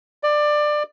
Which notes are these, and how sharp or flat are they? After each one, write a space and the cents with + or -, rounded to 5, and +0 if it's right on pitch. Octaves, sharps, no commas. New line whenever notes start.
D5 +20